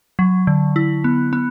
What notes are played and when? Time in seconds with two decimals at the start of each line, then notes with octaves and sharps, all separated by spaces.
0.19 F#3
0.47 D3
0.76 E4
1.04 B3
1.33 B3